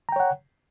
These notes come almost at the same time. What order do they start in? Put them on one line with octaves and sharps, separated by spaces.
A#5 G5 C#5 F#5